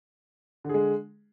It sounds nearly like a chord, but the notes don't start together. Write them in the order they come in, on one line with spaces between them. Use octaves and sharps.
D3 G#4 G#3